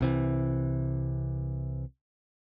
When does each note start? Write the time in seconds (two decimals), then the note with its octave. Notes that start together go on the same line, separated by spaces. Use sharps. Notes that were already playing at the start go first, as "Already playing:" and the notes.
0.01 C2 C3 E3